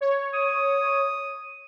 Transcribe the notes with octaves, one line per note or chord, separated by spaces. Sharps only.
C#5
D#6